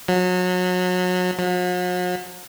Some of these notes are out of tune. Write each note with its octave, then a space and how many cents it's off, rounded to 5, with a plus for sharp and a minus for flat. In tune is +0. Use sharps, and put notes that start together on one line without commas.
F#3 -30
F#3 -45